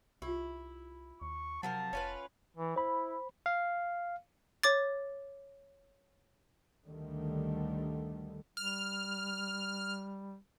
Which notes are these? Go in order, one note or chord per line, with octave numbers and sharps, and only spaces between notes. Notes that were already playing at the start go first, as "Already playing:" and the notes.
C2 E4 F4 G4
D#2 C#6
C3 F3 F#3 A#4 F#5 A5
F1 C#4 F4 B4
E3
E4 C5 B5
F5
C#5 D6 A6
D2 D3 D#3 G3 A3
G3 F6